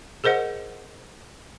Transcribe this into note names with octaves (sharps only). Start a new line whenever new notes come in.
G#4 A#4 C5 D#5 F#5